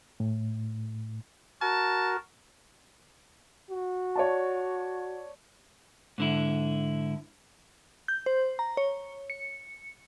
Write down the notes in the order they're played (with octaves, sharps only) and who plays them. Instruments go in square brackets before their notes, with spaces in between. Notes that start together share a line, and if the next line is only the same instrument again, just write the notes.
[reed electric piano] A2
[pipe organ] F#4 A#4 [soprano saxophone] A5
[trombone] F#4
[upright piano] C#5 D5 A5
[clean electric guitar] G#2 D3 E4
[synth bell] G6
C5
A#5
C#5
C#7